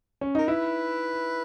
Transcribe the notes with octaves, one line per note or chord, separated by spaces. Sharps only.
C#4
D#4 A#4
E4 B4